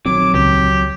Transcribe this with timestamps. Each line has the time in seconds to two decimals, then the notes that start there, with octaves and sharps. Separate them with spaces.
0.06 A#1 D#3 F#3 C4 D6
0.34 C#2 G4